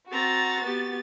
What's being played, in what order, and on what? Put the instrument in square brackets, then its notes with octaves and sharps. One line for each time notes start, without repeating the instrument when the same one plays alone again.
[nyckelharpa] C4 A#5 [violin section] F#4 A6
[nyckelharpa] B3 G4